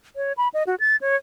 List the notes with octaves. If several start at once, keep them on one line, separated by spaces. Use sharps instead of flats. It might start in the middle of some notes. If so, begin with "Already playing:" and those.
C#5
B5
D#5
F#4
A6
C#5